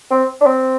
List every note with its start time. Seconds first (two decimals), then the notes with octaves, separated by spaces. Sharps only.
0.11 C4
0.41 D4
0.46 C4